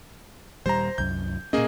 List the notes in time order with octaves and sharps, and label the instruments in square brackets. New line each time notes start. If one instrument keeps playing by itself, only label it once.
[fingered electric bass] D#1 G3 [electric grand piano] C5 A#5
[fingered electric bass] C2 F#2 [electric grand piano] G6
[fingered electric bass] A#2 C#4 [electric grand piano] A#3 G#4 D#5